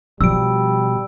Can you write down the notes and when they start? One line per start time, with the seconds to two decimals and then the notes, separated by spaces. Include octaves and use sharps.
0.21 B2 F3 G3 E6 D7